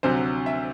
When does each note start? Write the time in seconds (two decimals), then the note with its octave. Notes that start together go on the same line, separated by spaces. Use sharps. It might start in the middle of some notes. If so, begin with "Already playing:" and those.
0.03 D2 C3 F#3 C5
0.46 E5